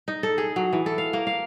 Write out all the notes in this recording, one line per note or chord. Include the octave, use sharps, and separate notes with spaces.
D#4
A4
G#4
F#3
E3
A4
F5
A#3
F5